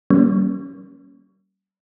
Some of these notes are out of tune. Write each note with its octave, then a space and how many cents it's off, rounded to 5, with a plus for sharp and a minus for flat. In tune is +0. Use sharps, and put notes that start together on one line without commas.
G3 -35 A#3 +0 C#4 +0